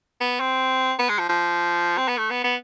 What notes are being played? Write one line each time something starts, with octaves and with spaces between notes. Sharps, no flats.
B3
C4
B3
G#3
F3
F3
C4
B3
A3
B3
B3